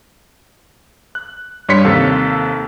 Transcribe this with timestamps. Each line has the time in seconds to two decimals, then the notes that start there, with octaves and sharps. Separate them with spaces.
1.15 F#6
1.69 G2 G3 C#5 C6 B6 C#7
1.85 D#2 C3 A4 F5